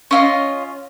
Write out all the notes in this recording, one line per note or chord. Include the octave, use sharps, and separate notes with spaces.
C#4 F4 D#5